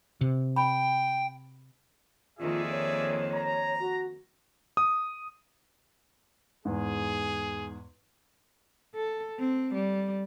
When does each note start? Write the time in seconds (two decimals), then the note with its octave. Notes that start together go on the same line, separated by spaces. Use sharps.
0.21 C3
0.56 G5 B5
2.39 F2 D#3 A#3 F4 G#4 D5 E5
2.70 C#5
3.32 A#5
3.80 F#4
4.77 D#6
6.65 E2 G#2 G#4
8.95 A4
9.39 C4
9.74 G3